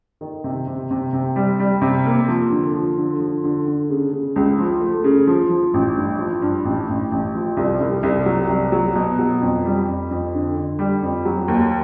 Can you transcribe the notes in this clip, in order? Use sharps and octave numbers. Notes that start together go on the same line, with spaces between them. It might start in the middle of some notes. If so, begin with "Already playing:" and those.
D#3
C3
C3
C3
C3
G3
G3
C3
A#3
F3
D3
F3
D3
F3
D3
D3
C#3
C#3
C#2
F3
A3
C#3
F3
F3
A1
G2
F3
G2
A1
A1
A1
F3
C2
C2
C2
F#3
C2
F#3
B2
F#3
F2
G3
F2
F2
D3
D3
G3
F2
F#3
D#2